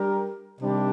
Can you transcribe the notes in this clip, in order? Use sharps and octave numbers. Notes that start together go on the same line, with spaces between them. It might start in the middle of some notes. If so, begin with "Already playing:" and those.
Already playing: G3 D4 G4 A#4
C3 D#3 G3 D4